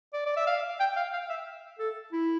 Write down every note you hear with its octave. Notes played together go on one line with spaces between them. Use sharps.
D5
D5
E5
F5
G5
F5
F5
E5
A4
E4